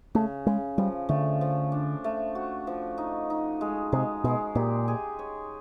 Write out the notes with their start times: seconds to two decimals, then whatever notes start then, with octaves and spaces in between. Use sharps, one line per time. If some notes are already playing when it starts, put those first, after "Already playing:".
0.15 C#3 A3
0.46 C#3 G#3
0.78 F3 G3
1.09 D3 A3
1.41 F3
1.72 D4
2.04 A3
2.35 F#4
2.67 F3
2.98 D#4
3.30 D#4
3.61 G#3
3.92 C3 G#3
4.24 B2 G#3
4.55 A#2 G4
4.88 G#4
5.19 C#5